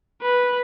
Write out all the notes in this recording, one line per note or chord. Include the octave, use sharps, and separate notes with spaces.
B4